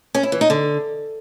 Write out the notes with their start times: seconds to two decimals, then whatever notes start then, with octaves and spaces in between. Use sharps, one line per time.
0.15 C#4
0.23 E4
0.32 E3
0.41 D#4
0.50 D3